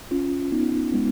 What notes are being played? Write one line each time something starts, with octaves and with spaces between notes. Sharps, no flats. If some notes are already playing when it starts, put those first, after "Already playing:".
C#4 F4
B3 D#4
G#3 B3